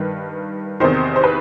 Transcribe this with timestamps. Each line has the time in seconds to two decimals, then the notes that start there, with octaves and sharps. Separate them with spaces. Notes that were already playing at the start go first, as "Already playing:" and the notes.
Already playing: G2 D#3 B4
0.80 E2 C3 D#3 C5
1.16 C5
1.24 B4